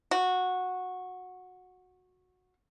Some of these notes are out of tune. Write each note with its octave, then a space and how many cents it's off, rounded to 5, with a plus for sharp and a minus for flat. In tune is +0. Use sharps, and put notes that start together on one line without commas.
F#4 -15